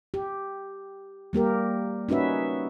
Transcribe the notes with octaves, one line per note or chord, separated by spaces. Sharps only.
G4
G3 A#3 G4 A#4
C#4 D#4 F#4 B4 E5